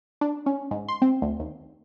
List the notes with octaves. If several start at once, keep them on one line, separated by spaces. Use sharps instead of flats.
D4
C#4
G#2
C6
C4
D2
D#2